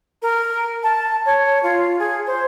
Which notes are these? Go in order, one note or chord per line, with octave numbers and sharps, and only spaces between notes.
A#4
A5
C#5
F4
G#4
C5